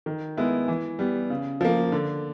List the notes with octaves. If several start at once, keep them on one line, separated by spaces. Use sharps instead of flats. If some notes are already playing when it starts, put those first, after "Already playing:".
D#3
G#3 B3 E4
E3
G3 B3
C#3
F3 A#3
D3